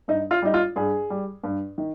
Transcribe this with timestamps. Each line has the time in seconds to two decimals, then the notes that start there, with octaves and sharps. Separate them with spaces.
0.08 G2 D#4
0.31 F4
0.42 G3 D#4
0.54 F4
0.76 G2 G#4
1.10 G3
1.43 G2
1.78 D#3